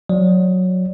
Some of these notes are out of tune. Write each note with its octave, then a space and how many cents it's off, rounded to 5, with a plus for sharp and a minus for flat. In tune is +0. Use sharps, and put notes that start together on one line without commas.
F#3 -15 D5 +0